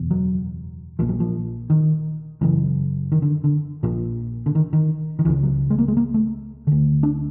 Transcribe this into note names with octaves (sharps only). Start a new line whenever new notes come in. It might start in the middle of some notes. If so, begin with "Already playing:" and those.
Already playing: F#1 E2 B2
F#3
A#1 A#2 F3
F#3
F3
D#3
F#1 F#2 C#3 E3
D#3
D3
D3
A#1 A#2 F3
D3
D#3
D#3
D#3
C#2 C#3 E3
F#3
G#3
A#3
G#3
A#3
A3
D2 D3
D4